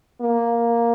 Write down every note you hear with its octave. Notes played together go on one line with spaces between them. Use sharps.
A#3